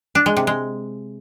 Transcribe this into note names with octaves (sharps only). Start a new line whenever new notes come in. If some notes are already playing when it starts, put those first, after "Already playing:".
D4
G#3
C3
G#3